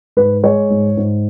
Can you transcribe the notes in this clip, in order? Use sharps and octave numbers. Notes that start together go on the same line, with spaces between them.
G#2 B4
G#3 C#5
G#2
G#2